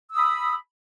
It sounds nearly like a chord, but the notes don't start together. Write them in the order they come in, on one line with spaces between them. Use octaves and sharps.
E6 D#6 B5